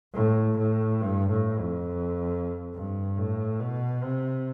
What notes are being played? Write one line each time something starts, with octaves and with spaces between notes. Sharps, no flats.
A2
A2
G2
A2
F2
G2
A2
B2
C3